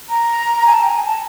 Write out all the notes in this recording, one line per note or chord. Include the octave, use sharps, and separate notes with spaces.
A#5
G#5
A5
G5
G#5
A5